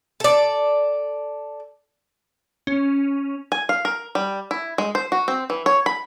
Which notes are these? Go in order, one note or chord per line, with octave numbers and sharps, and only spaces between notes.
A4 D5
C#4
G#5
F5
A#4
G3
E4
G#3
C5
F#4
C4
E3
C#5
B5